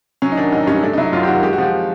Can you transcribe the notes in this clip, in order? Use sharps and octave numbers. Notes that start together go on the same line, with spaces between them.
F#3 C#4
D#4
D#3 D4
A1 D#4
D4
G2 C#4
A3 D4
D#4
F#3 E4
F#2 F4
G4
D#3 F#4
G#3 G4
F#4
F3 G4